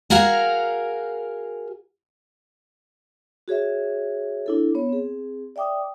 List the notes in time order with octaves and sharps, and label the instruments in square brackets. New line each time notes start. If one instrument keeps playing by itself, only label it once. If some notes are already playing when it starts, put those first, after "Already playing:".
[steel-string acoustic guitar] F#4 G#4 A#4 F5 F#5 A#5
[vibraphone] F#4 G#4 C#5 E5
D4 E4 A4
B3 C#5
C4 G#4
D5 E5 G5 D6 D#6